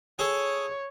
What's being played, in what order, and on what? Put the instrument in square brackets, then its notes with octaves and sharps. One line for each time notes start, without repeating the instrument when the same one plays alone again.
[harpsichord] G#4 A4 [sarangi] C#5